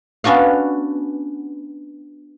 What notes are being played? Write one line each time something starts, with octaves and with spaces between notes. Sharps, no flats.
B3 C#4 D4 F#4 F5